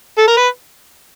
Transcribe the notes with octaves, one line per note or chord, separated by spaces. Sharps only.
A4
A#4
B4